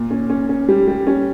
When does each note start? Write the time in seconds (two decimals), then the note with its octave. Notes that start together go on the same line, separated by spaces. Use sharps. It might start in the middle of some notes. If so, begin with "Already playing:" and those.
Already playing: A#2
0.10 C#4
0.30 C#4
0.49 C#4
0.68 G3
0.88 G3
1.07 C#4